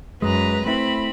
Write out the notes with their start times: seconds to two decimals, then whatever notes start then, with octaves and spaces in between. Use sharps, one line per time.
0.22 F#2 G#3 B4 A#5
0.66 A3 C4 E4 B5